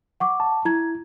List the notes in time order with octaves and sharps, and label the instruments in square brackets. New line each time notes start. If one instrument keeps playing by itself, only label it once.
[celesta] F#5 C#6 D6
[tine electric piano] A5
[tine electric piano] E4 [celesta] A#5 G#6